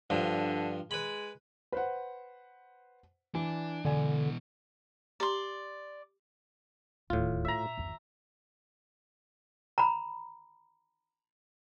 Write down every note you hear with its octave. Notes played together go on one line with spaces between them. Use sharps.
G2 D3 F3
G#3 B4 B5
B4 C5 F#5
E3 D4
B2 D3 E3 D5 G#5
G4 D5 A#5 C6
D1 D#2 A2 F4
A#2 E5 A#5
G#1 F2
A#5 B5